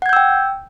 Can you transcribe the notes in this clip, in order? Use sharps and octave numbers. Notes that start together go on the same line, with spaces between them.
F#5 G5 E6 G6 G#6